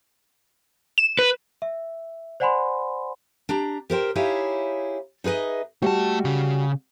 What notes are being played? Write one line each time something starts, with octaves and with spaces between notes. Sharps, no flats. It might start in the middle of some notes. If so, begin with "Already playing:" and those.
E7
B4
E5
C5 D5 F#5 G#5 B5 C6
D4 G4 A#5
G4 A#4 C5 G5
D#4 E4 G4 G#4 C#5 F5
D#4 G#4 B4 D#5 E5
G3 A3 F#4 A5
C#3